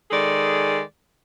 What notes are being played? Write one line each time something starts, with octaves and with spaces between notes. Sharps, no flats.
D#3 G#3 G#4 A4 D5